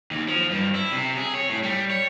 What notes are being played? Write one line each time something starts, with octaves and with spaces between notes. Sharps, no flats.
D#2
F3
G2
E4
C3
G#4
C#5
A2
G3
C#5